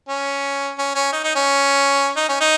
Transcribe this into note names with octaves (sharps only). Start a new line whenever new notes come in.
C#4
C#4
C#4
D#4
D#4
C#4
D#4
C#4
D#4